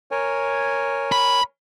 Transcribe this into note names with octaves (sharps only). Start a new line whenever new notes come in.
A#4 C#5 G#5
B5